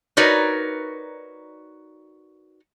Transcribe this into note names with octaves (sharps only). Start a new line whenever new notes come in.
D#4 F#4 A#4 B4 C#5 D5